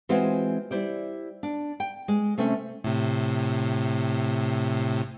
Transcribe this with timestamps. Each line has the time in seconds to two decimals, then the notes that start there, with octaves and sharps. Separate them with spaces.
0.09 E3 G#3 C4 F4 F#4 C5
0.71 G3 E4 C5 D5
1.43 D4
1.80 G5
2.08 G#3
2.38 C3 A3 C4 C#4
2.84 A2 C3